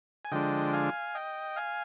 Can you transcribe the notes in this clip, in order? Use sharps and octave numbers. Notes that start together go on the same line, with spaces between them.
G#5
D3 F3 G#3 D4 D#5 G5
F5 G#5
D#5 G5
F5 G#5